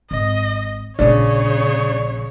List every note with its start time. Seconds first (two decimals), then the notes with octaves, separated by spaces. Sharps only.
0.11 G#1 D#5
0.99 A#1 C#3 C#4 D4 C#5